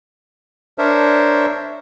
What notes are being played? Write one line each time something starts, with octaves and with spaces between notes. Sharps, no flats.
D4 A#4 C5 C#5 E5